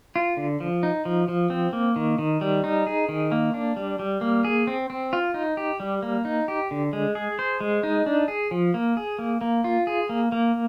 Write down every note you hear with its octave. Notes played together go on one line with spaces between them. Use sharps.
F4
D3
F3
D#4
F3
F3
C4
A#3
D#3
D#3
G3
D#4
G#4
D#3
A#3
D4
G3
G3
A#3
G#4
C4
C4
F4
D#4
G4
G3
A#3
D#4
G4
D3
G#3
G#4
C5
G#3
D#4
D4
G#4
F3
A#3
G#4
A#3
A#3
F4
G#4
A#3
A#3